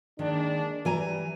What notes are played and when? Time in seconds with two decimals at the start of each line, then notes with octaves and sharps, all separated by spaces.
0.19 D#3 G#3 A#3 D4
0.85 E3 G3 G#5 A#5